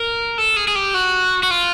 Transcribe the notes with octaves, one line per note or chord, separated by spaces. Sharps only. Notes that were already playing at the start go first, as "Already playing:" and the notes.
Already playing: A#4
A4
G#4
G#4
G4
F#4
F#4
F4